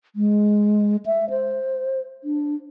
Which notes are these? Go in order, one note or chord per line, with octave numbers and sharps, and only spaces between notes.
G#3
E5
C5
D4